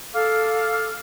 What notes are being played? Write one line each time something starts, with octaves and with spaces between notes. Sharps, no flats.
A4 F5 D6 F6